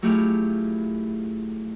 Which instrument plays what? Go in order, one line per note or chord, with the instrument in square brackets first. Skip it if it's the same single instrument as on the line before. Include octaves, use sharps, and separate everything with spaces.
[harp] F#3 A3 E4 F4 G4 G#4